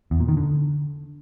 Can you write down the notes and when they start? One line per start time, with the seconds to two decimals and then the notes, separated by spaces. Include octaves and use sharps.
0.11 E2
0.20 A#2
0.28 D#3
0.37 D3